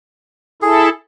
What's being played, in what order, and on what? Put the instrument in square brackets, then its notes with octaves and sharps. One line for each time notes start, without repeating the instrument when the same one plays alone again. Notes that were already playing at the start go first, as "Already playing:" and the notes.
[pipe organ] E4 A4 [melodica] G#4